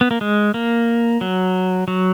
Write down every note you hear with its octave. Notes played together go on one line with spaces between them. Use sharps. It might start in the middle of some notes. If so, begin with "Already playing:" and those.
B3
A#3
G#3
A#3
F#3
F#3